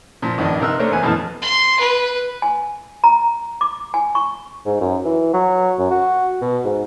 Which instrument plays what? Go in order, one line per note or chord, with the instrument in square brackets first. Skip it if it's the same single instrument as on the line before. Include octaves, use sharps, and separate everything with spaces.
[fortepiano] A#2 F3
A#1 G2 D#3 D4 D#5
C3 D#4 A#4 E6 F#6
A3 A#3 D4 A#4 C5 C#5
E2 B3 G#5 F#6
F2 B2 E3 A3 A5 F6
[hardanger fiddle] C6
B4
[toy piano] G#5
A#5
D6
G#5
C#6
[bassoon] G#2
F#2
E3
F#3
F#2
F#4
B2
G#2